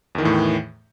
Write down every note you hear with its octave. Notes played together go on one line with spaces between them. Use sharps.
E2 A2 D#3 E3